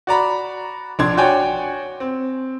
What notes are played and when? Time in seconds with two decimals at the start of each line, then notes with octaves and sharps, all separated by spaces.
0.07 F#4 D5 A#5 B5
0.99 A#1 D4 C6 G#6
1.17 F#4 C#5 D5 G5 G#5
2.00 C4